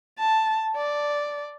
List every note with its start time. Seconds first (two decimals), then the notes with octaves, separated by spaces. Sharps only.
0.19 A5
0.76 D5